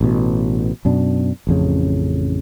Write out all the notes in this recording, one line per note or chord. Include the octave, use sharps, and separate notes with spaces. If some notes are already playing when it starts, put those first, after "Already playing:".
A1 B2
F#2 B2 D4
A1 F2 C#3